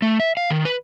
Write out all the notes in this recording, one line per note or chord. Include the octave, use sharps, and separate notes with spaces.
A3
E5
F5
D#3
B4